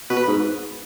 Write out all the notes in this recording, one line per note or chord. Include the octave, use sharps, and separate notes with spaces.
B2 B4
G#2